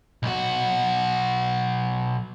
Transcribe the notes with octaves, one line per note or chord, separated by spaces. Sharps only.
B1 F#4